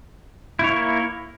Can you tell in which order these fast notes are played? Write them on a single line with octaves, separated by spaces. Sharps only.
E4 C#5 A#3